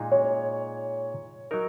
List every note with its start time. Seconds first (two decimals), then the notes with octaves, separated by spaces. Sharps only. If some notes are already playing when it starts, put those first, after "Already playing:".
Already playing: A#2 G#3 D#4 G#4
0.12 C#5
1.51 F#3 D#4 A#4